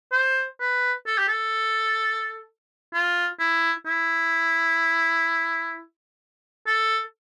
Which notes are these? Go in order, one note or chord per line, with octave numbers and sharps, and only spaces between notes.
C5
B4
A4
G4
A4
F4
E4
E4
A4